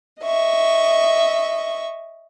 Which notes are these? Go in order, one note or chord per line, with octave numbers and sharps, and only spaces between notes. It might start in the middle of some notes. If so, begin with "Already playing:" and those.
D#5 E5 C#6